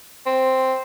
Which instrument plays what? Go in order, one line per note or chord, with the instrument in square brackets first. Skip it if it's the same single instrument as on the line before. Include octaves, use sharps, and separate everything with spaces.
[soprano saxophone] C4